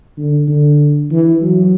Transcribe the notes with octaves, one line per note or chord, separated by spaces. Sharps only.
D3
D3
E3
F#3